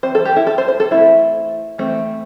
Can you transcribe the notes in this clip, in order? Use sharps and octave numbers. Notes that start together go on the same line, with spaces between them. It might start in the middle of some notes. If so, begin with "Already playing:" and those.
E3 C4 C5
A4
G4
E4
A4
C5
C5
A4
E3 A3 C4 E4
E3 A3 C4